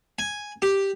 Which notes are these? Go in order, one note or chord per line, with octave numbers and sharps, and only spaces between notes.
G#5
G4